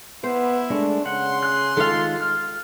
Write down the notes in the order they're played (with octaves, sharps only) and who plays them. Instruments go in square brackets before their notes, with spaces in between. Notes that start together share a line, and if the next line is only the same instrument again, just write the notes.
[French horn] B3 [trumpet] E4 [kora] C5
[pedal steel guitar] G#3 A3 [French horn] D4
[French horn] C#3 [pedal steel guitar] F#5 [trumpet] C6
[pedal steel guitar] G#4 F#6
[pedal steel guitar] D#3 G#3 F4 [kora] A4 F5
[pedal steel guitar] F6